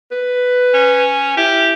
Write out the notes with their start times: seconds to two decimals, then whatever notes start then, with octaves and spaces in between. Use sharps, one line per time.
0.11 B4
0.74 C#4
1.37 E4 G4